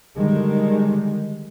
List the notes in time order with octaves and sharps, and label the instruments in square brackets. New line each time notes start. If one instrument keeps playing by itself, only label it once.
[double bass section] D3 D#3 G3 G#3